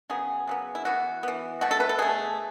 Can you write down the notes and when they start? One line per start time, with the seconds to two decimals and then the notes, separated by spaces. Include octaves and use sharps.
0.10 C#3 F#3 B3 G#4
0.47 C#3 F#3 B3
0.75 E4
0.85 E3 B3 F#4
1.23 E3 B3
1.61 B2 A3 F#4
1.71 A4
1.80 B4
1.89 A4
1.98 B2 A3 G#4